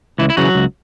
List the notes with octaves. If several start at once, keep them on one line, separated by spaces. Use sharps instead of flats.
C#2 E3 E4
E4
C#3 E3 F#3 F#4
C#2